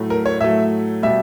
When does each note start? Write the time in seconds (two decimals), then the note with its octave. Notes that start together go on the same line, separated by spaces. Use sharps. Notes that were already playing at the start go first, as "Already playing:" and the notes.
Already playing: A2 F#3 A3
0.10 A#4
0.26 C#5
0.41 A2 F#3 A3 E5
1.03 B2 G3 E5